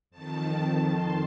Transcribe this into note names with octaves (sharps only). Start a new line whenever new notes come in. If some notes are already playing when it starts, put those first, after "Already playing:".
F2 D#3 A5
C6